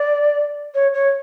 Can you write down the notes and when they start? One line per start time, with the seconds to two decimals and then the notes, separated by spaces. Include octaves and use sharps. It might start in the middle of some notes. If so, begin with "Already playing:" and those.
Already playing: D5
0.74 C#5
0.94 C#5